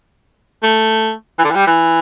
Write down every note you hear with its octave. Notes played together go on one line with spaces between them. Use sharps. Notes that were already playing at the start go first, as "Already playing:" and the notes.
A3
E3
D3
E3
G3
E3